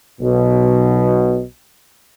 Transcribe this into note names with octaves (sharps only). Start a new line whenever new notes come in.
B1 B2